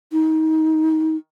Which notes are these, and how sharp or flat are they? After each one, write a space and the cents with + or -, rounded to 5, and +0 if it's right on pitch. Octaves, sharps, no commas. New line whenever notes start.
D#4 +25